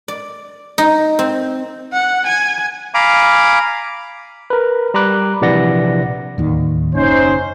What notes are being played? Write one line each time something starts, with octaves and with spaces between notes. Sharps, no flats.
D5
D#4
C4
F#5
G#5
F5 G#5 A#5 B5 D6
A#4 B4
G3 A#5 B5 D6 F#6
A#1 C3 E3 D5 F#5 A#6
D1 D#2 D#3
F#1 C#4 D#4 C5